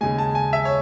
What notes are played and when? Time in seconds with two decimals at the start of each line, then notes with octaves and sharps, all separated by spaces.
0.01 D#2 C#3 G#3 G#5
0.18 A5
0.35 G#5
0.53 E5
0.65 C#5